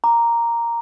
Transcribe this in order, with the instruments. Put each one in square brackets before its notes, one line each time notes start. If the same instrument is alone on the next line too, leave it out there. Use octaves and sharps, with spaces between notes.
[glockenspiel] A#5 D6